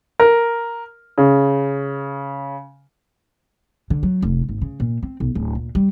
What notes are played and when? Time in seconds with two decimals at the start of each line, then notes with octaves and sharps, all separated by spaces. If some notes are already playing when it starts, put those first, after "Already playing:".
0.20 A#4
1.18 C#3
3.90 D3
4.03 F#3
4.22 F1
4.49 G#1
4.62 C#3
4.80 A#2
5.03 C4
5.20 B1
5.35 D1
5.55 A#2
5.75 G3